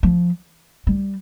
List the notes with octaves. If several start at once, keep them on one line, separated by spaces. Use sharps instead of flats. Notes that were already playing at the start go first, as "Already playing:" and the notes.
F3
G3